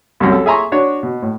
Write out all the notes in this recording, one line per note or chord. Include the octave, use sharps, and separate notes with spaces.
C2 F#2
A4
G#4 E5 G#5 A#5 C6 C#6
D4 F#4 C#5
B2
A2